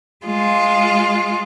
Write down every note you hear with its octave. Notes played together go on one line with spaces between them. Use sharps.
G#3 F4